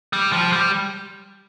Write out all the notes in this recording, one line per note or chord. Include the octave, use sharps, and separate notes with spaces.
G3
F3
G3